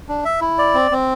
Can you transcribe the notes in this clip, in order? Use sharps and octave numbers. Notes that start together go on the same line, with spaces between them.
D4
E5
E4
D5
C4
C4